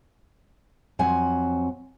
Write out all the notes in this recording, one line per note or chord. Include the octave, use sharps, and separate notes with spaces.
F2 F#3 C4 F#5 G#5